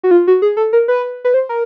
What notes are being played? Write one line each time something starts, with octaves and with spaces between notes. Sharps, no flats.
F#4
F4
F#4
G#4
A4
A#4
B4
B4
C5
A#4